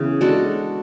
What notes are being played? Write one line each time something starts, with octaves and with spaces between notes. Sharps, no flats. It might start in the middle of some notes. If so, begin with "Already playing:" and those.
Already playing: C#3 E3 B3
G#3 D4 F#4 A4